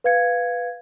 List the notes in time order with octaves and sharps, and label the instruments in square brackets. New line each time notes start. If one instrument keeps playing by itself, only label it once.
[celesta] B4 F5 G#6 C#7